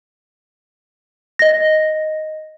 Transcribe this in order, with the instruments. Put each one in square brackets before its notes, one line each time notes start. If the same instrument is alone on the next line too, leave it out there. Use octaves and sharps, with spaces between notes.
[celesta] D#5 A#6